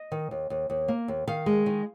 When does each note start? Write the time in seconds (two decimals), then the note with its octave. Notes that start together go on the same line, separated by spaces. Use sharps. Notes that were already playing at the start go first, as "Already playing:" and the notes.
Already playing: D#5
0.12 D#3
0.31 D#2
0.50 D#2
0.70 D#2
0.88 A#3
1.08 D#2
1.27 D#3 F5
1.46 G#3
1.66 D#3